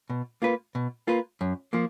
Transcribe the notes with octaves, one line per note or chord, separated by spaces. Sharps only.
B2
A#3 F4 B4
B2
A#3 F4 B4
F#2
F3 A#3